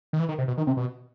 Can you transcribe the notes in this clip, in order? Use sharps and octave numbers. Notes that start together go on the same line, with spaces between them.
D#3
E3
D#3
C3
B2
D#3
C3
B2